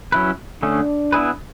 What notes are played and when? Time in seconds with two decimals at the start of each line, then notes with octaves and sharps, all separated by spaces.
0.12 F#3 C#4 E4 B4
0.62 D3 A3 C#4 D4 G#4
1.12 B3 E4 G#4 B4